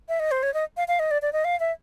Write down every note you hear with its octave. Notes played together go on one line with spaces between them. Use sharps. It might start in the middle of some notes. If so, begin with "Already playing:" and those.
E5
D#5
C5
C#5
D#5
F5
F5
D#5
D5
D5
D#5
F5
E5